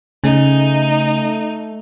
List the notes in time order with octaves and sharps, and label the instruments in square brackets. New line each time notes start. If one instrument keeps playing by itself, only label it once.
[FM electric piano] C#3 [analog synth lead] A3 [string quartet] D#4